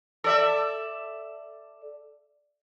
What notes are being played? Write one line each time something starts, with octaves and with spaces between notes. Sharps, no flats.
A4 D5 E5